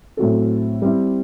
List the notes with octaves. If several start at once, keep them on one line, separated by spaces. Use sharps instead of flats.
A2 F#3 C4 F#4 A4
G3 C4 E4